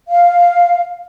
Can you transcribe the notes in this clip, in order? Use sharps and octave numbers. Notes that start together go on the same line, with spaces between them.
F5